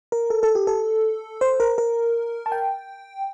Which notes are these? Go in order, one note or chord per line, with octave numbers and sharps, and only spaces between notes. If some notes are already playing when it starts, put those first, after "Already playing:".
A#4
A4
A4
G4
A4
C5
A#4
A#4
A5
G5